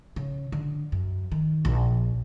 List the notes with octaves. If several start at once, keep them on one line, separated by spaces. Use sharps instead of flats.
C#3
D3
F#2
D#3
A#1